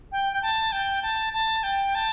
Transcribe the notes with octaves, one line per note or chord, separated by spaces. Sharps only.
G5
G5
A5
G5
A5
A5
G5
A5